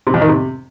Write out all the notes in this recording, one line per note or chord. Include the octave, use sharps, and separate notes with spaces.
C3
F2
D#3
C3